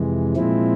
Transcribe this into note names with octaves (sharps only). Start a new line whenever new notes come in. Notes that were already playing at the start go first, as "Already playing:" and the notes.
Already playing: F2 C3 E3 G#3
A#2 F3 G#3 C4 E4